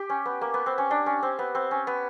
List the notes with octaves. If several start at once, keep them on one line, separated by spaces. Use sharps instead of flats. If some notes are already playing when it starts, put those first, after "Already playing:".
Already playing: G4
C#4
B3
A#3
B3
C4
C#4
D4
C#4
C4
B3
C4
C#4
B3